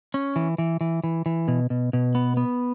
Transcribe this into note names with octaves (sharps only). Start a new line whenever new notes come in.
C#4
E3
E3
E3
E3
E3
B2
B2
B2
B3
B3